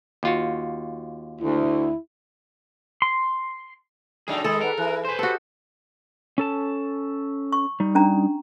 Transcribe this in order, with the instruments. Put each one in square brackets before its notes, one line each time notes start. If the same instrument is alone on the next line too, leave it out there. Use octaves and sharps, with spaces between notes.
[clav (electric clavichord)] D#2 F4 F#4
[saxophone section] D2 [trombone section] E4
[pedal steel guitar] C6
[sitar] F#3 A3 D#4 [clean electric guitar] D4 G#4
[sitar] D#3 G#4 [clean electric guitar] G#3 [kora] A4 [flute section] B5 D#6
[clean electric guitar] A#4 [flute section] B4 D5 F#5
[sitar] E3 [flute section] E4 F#6
[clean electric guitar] B4 C5 [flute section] G#5 C6 G6
[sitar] B3 [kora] F#4 A4 [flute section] G4 D#5
[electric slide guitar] C#4 A4 A5
[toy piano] C#6
[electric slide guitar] G3 D#4
[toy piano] C#4 D4 A#5